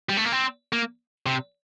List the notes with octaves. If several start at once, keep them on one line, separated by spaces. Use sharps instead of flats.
G3
A3
A#3
C4
A#3
C3